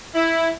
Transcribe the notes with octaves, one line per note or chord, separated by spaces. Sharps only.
E4